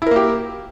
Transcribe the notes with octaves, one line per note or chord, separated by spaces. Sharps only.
A#3 E4 G4 A#4